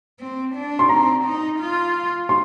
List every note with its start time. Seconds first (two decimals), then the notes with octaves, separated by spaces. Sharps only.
0.20 C4
0.55 D4
0.79 C6
0.89 C4 A#5
1.25 D#4
1.60 F4
2.29 C6